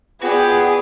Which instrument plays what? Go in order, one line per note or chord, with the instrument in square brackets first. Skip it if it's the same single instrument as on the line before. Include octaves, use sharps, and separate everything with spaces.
[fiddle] B3 D5 [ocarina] F4 [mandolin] F#4 G5 [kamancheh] G#4